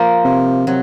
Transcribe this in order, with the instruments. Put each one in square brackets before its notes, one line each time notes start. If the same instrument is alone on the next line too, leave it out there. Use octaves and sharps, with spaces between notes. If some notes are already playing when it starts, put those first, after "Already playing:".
Already playing: [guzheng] F3 A#3 F4 A#4
[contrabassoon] C3
[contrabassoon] C3 [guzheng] F#3